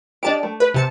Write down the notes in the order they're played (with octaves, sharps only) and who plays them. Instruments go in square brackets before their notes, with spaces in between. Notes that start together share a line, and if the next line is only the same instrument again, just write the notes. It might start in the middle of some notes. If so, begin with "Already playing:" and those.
[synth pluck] D4 A5 D7 [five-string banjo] G4 D#5
[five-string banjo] A3
[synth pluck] B4
C3 A5 C#7